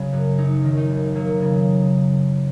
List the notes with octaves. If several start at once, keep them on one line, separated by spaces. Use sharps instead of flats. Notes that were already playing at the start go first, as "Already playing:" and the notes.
Already playing: C#3 F#3
F#2
F#3 D#4
D#3
D#4
D#2
F#3 A#3
C#3